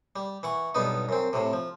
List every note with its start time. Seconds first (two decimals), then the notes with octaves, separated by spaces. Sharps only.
0.16 G3
0.43 E3 F#5 C#6
0.75 B1 G2 B3 D#4
1.09 F#2 C4
1.33 A2 C3
1.53 F3